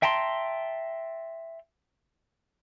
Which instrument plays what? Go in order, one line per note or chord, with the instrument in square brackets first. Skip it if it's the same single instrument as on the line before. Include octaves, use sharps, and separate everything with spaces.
[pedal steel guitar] E5 G5 A5 A#5 C6